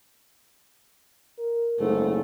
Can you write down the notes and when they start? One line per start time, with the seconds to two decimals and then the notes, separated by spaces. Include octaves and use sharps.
1.39 A#4
1.79 F#1 G#2 A3